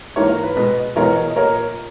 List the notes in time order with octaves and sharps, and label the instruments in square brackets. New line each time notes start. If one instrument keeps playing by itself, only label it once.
[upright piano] G#2 E3 A#3 A#4 C#5
A#4
B4
B2 G#3 B3 B4 D#5
E2 B2 G#3 A#4 C#5
D#5
A#2 A#3 A#4 C#5